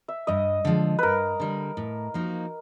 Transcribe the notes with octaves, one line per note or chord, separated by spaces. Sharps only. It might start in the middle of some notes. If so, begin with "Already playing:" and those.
E5
G2 D#5
D3 F3 G#3
G2 A#4 B4
D3 G3
A2
F3 A#3 D#4 F#4